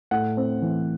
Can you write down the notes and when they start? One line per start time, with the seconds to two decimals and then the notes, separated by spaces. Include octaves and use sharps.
0.11 A2 F#5
0.37 C4
0.62 E3